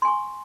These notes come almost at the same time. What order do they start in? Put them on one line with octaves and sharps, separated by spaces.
C6 G#5 C#6